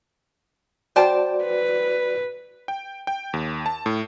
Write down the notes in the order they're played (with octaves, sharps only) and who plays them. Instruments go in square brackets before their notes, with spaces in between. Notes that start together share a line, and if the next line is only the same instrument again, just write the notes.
[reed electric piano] F#4 D5 [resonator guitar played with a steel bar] C5 G5 A5
[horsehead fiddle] B4
[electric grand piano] G5
G5
D#2
A5
A2